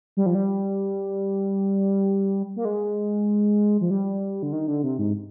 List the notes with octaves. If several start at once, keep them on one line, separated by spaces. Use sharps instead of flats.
G3
F3
G3
A#3
G#3
F3
G3
D3
D#3
D3
C3
G#2